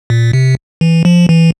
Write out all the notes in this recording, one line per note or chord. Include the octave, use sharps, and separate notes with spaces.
A#2
C3
E3
F3
E3